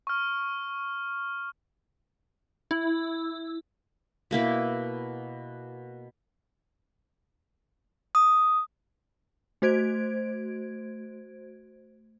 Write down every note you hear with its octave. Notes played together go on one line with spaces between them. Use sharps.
C#6 F6
E4
B2 A#3 E4 B4
D#6
A3 F#4 C5 G#6 D7